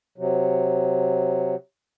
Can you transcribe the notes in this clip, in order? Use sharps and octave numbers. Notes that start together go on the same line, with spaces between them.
C3 F#3